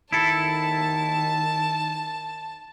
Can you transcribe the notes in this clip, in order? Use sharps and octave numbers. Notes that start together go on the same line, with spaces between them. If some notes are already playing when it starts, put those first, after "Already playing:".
D#3 E4 A4 A5